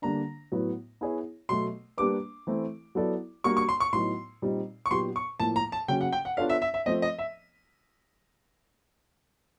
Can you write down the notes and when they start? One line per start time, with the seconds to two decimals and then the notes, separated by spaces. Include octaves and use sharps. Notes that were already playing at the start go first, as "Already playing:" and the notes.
0.02 D3 G3 A#3 D4 A#5
0.52 A2 F#3 B3
1.01 B3 E4 G#4 C#5
1.49 B2 F#3 A3 C6
1.97 G3 A#3 D4 G4 B4 D6
2.47 E3 A3 C4 E4
2.95 F#3 B3 E4 A4 D5
3.44 G3 A#3 D4 F#4 C#6
3.57 C#6
3.69 C6
3.80 C#6
3.93 A2 F#3 B3 D#4 C6
4.42 A#2 G3 C4 D#4
4.86 C#6
4.91 A#2 F#3 B3 D#4 G4 C6
5.16 C#6
5.40 A2 F3 A#3 A5
5.56 A#5
5.72 A5
5.88 C#3 F#3 A#3 C#4 F#4 G5
6.01 F#5
6.12 G5
6.25 F#5
6.37 B3 D4 F4 A4 C#5 F5
6.49 E5
6.62 E5
6.74 E5
6.86 F3 A3 C4 D#5
7.02 D#5
7.18 E5